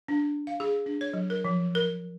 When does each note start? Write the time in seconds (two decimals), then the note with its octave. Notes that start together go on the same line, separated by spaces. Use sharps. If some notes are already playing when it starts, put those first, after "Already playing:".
0.08 D4
0.47 F5
0.60 G#4
0.86 D4
1.01 C#5
1.14 F#3
1.30 A#4
1.45 F3
1.75 A#4